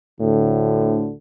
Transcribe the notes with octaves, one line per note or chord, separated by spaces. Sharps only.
D2 A2 D3